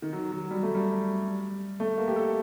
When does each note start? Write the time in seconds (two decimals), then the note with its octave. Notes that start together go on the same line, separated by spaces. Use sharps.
0.02 D#3
0.13 F#3
0.32 F#3
0.51 G3
0.63 A3
0.75 G3
1.80 A3
1.98 A#3
2.07 G4
2.16 A4